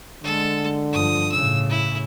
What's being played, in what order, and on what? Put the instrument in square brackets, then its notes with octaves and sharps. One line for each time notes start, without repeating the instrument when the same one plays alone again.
[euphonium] D3 [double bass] G#3 [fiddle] A4
[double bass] G2 F3 [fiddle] D#6
[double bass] A2 C#3 [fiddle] E6
[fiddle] E4